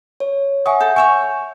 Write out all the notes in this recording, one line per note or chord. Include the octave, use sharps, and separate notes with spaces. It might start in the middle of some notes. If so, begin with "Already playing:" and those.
C#5
E5 F#5 G#5 C#6 D#6
A4 G6
C#5 E5 G#5 C#6